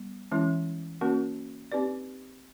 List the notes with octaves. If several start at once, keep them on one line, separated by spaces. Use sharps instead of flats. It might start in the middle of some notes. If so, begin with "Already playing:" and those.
Already playing: G3 B3
E3 G#3 C#4 E4
A#3 C#4 F#4 A#4 C#5
C4 D#4 G4 B4 D5